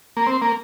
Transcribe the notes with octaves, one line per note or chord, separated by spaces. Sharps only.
A#3
C4
A#3